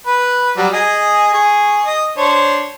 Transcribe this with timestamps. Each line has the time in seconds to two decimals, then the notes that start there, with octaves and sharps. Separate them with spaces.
0.07 B4
0.57 F#3 G3
0.74 G#4 D#5 G#5
1.34 G#4 C#6
1.86 D#5
2.17 D4 C5 C#5